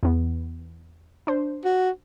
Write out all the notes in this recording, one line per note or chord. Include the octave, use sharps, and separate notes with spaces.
E2 B3
D4 C5
F#4